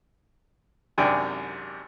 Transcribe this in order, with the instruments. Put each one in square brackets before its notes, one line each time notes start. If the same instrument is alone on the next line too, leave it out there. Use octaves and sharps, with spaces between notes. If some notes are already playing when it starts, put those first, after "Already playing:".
[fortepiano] G#1 F#2 C3 D4 G5 G#5